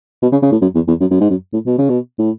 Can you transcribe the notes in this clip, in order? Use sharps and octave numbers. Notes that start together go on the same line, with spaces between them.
B2
C#3
C#3
A2
F#2
E2
E2
F#2
F#2
G#2
F#2
A2
B2
C#3
B2
A2